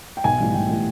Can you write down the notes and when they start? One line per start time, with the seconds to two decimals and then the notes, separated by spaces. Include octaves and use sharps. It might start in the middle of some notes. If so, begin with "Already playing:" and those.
0.17 G5
0.24 B1 G#5
0.40 A2 E3 G3
0.54 B1 G5
0.69 A2 E3 G3